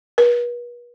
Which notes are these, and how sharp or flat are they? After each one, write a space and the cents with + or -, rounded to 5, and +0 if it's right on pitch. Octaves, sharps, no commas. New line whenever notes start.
B4 -40